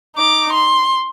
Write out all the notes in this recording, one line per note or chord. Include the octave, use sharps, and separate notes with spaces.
D#4 D6
C6